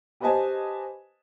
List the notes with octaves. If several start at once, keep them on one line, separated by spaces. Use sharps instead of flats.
G4 B4 C5 D#5 G#5 A5